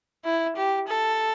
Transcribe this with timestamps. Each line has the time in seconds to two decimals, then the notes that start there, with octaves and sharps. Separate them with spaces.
0.24 E4
0.56 G4
0.88 A4